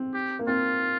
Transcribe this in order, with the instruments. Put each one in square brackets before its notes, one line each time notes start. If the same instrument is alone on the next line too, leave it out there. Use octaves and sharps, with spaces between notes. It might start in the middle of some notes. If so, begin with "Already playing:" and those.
Already playing: [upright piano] C4
[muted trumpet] G4
[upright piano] A#3
[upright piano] C4 [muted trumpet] F4